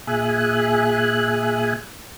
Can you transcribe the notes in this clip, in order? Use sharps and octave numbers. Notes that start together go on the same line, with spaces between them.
A#2 G#4 E5 G#5 F#6